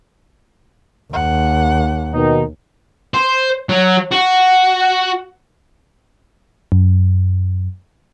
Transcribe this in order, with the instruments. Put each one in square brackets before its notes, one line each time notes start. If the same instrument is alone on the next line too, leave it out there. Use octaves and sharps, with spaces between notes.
[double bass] D#2 [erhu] F#5
[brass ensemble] B2 D#3 D#4
[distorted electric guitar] C5
F#3
F#4
[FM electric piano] F#2